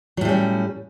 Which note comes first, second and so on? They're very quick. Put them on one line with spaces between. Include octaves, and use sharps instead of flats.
F#3 A2 G3 C#4